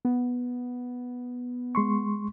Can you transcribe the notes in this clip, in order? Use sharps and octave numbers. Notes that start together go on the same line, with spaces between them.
B3
G#3 C6 C#6